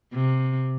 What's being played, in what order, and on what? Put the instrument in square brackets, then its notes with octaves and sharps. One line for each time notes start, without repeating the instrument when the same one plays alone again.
[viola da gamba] C3